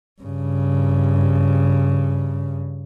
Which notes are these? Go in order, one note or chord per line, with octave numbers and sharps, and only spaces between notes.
G2 C#3